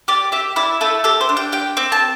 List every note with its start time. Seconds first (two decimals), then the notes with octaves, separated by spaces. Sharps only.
0.08 G4 D5
0.32 G4 E5
0.56 E4 D5
0.81 A3 A4
1.04 G4 A4
1.21 C5
1.29 D4
1.37 G5
1.52 G4 G5
1.77 C4
1.92 A5